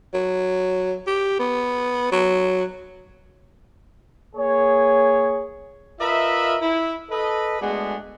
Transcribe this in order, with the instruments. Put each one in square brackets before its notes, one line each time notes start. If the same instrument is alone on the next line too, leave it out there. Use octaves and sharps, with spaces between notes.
[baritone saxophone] F#3
G4
B3
F#3
[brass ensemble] A#3 G#4 C#5
[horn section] F4 A#4 B4 D#5 E5
E4
A4 B4 D#5
G#3 A3 B3 D4 F#4 G#4